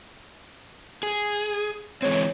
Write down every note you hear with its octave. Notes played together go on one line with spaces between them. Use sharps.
G#4
E3 G#3 C4 C#5